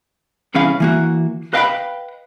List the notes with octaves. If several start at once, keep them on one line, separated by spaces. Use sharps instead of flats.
C2 E3 C#4 G#4 F5 B5
E3 A#3 F#4
B4 D#5 F5 G5 A#5 B5